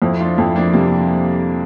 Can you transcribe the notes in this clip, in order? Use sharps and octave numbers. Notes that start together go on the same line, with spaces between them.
F2 C4 E4
D4 F4
F2 C4 E4
A#3 D4
C3 G3 A#3